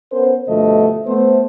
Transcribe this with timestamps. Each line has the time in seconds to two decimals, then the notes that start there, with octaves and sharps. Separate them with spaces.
0.12 B3 C#4 A#4 C5
0.49 G2 B2 D3 F3 A3 D#5
1.07 A3 B3 C5